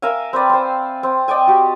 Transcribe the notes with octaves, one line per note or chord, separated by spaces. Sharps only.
A#4 E5 F5 G#5
C4 B4 D5
C4 C5
C4
D5 D#5 G5 G#5
F#4 G4